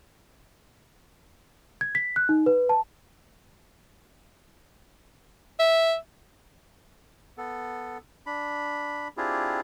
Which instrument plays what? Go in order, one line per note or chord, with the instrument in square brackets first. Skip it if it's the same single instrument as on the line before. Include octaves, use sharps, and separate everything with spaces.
[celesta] G#6
B6
F#6
D#4
B4
A5
[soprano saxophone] E5
[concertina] B3 A4
D4 B5
C4 D4 E4 F4 G4 G#4